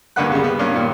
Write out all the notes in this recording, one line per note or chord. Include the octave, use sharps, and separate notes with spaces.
D2 G2 A#3 B4 F#5 F#6
C#3 G3
B3
G2 A#3 C#4
A#2 D#3